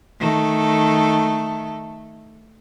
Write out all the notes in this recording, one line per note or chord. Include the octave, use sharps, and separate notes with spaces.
D#3 A3 A4